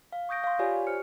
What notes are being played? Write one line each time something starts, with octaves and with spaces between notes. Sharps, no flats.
F5
C#6 D#6 G6 A#6 D7
F5 C6
F4 G4 C#5 D5 G#5
G4
C5 F6 C#7